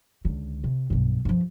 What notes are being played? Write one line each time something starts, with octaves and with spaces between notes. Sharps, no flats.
C#2 D3
C3
B1 G2
G2 F3